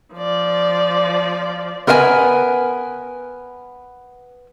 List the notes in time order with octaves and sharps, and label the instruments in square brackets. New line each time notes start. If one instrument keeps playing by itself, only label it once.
[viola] F3 D5
[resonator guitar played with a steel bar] B3 A#4 B4 D#5 G#5